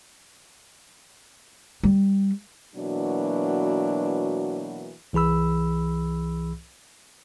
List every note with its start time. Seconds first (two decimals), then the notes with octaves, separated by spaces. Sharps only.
1.83 G3
2.76 B2 E3 F#3 A#3 D4 F#4
5.13 C2 E3 G#4 B5 E6